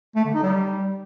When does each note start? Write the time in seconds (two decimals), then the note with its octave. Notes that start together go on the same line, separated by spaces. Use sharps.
0.16 A3
0.25 D3
0.34 D#4
0.43 G3